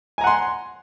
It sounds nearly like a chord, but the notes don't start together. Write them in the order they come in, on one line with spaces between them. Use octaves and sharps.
G#5 A#5 F#5 C6